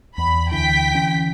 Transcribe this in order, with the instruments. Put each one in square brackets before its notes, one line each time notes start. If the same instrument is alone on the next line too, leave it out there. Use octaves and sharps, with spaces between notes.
[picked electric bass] E2 [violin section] B5
[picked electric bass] D2 D3 E3 [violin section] G5 B6
[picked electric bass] D3 E3 C#4